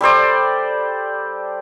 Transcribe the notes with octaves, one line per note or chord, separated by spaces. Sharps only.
G3 A4 C5 D5